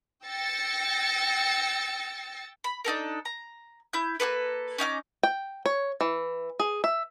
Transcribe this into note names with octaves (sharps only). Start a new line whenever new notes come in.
G5 E6 A6 A#6 C#7
B5
D4 D#4 A4 A#4
A#5
E4 G6
A#3 G#4 A4 B4
C#4 D#4 F5 D6
G5
C#5
E3
G#4
E5